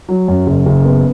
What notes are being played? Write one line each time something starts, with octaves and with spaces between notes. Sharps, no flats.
F#3
F#2
F#1
F#1
B3